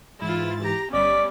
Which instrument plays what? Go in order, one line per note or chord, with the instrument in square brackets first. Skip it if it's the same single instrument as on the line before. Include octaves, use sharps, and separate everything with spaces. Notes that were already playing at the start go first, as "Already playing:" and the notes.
[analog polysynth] G#2 E3 A6 [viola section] E4 F4
[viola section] G4 A#5
[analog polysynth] G1 D#5 B6 [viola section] G3 B3 C#4 [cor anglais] D5